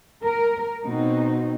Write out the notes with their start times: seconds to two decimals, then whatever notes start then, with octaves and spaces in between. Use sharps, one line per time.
0.25 A#4
0.84 B2 C4 D#4